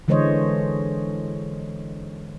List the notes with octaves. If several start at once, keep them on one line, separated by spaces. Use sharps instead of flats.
D3 E3 G#3 C5 C#5 D#5